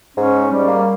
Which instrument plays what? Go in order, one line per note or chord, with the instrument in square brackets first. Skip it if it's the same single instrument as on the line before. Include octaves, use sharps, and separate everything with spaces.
[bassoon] G#2 [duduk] C#4
[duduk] G3
[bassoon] A#3